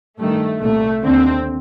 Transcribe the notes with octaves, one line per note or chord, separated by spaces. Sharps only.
G2 D#3 A3
C2 A#2 A3
D#2 D3 C4